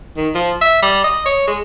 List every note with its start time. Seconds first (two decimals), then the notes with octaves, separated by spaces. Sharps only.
0.17 D#3
0.35 F3
0.62 E5
0.82 G3
1.04 D#5
1.26 C#5
1.47 G#3